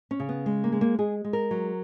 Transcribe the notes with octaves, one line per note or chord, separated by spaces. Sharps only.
C#4
C#3
B3
G#3
A#3
G#3
A#3
G#3 G#4
G#3
A#4
F#3